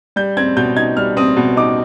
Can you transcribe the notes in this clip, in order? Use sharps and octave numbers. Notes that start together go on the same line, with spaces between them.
G3 G6
C4 G#6
B2 G6
D#4 G#6
G3 F6
C4 D#6
B2
D#4 D6